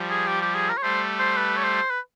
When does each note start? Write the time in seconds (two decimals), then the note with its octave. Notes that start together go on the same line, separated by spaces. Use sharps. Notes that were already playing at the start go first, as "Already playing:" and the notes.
Already playing: F3 G3
0.10 G#4
0.27 G4
0.42 G4
0.55 G#4
0.69 A#4
0.78 C#5
0.82 G3 A3 C5
1.19 C5
1.37 B4
1.57 C#5
1.64 C5
1.90 B4